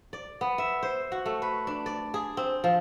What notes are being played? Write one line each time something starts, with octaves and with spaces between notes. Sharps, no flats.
D5
B3
E5
C5
F#4
A3
B4
D4
D5
G#4
C4
F3